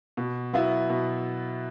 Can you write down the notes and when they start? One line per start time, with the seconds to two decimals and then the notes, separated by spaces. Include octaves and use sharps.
0.17 B2
0.53 F#3 B3 E4
0.89 B2